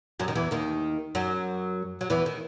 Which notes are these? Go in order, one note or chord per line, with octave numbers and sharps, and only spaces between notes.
F#2 F#3
D#3
E2 E3
D#2 D#3
F#2 F#3
F#3
E2 E3
D#3